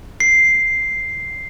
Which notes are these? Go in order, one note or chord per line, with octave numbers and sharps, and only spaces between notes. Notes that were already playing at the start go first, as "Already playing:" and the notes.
C7